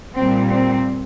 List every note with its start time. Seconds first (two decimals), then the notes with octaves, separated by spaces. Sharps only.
0.14 A#2 G3 C4
0.49 C4